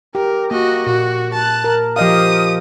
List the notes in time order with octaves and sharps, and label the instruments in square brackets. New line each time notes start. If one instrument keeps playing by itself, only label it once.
[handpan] G4 [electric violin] A#4
[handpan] A#3 [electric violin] F#4 D#5
[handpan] A#2 [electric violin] F#4
[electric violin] A5 F#6
[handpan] A#4
[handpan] F3 D#5 F5 [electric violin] G4 D#6